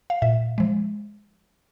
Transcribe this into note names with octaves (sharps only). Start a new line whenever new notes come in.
F5
A#2 E5
F3 G#3